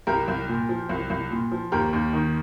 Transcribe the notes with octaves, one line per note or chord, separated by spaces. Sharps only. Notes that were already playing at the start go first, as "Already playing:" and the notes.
C2 G4 A#4
C2
A#2
F3
C2
C2
A#2
F3
D#2 G4 A#4
D#2
D#3